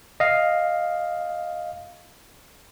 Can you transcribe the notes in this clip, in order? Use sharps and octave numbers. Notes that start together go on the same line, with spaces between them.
D#5 F5